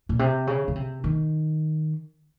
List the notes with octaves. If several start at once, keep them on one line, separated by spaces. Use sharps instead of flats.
A#2
C3
C#3
C#3
C3
D#3